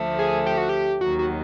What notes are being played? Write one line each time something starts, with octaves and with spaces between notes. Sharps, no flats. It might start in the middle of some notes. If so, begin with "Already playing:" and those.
Already playing: D2 D3 F3 A3
G#4
G4
F#4
G4
D#2 D#3 F#3 F#4
F#4